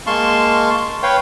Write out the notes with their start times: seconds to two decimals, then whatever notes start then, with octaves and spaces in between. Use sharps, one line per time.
0.07 G#3 A#3 F5 A5 C6 C#6
1.03 B4 C#5 F5 G5